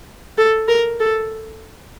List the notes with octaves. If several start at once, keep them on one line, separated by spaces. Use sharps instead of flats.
A4
A#4
A4